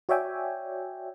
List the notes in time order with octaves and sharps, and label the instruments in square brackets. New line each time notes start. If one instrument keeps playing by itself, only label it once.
[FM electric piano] F#4 C#5 D5 E5 G5 G#5